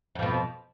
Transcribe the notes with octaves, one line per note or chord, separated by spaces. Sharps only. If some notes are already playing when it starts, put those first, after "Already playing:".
F2 B2 F3